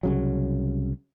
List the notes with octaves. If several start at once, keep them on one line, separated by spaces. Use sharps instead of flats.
C2 C#3 F#3